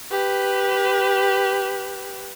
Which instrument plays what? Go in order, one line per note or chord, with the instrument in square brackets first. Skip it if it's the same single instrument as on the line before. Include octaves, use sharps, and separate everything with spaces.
[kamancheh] G4 B4